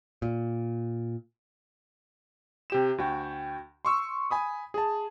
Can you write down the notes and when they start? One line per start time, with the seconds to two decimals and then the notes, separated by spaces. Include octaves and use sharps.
0.22 A#2
2.70 C3 G4 E7
2.98 D2 F#4 G5
3.85 C6 C#6 E6
4.31 G#5 B5 D#6
4.74 G#4 A5